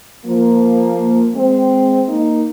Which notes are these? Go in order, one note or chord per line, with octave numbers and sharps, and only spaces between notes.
F3 A#3
G#3 C4
A#3 D#4